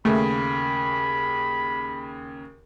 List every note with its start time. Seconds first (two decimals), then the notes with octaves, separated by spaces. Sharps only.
0.05 D#2 C#3 A3 B5